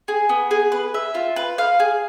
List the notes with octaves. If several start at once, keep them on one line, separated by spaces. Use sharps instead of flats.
G#4
B3
G#4
B4
E5
F4
B4
F5
G#4